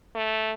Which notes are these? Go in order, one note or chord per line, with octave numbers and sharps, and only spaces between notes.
A3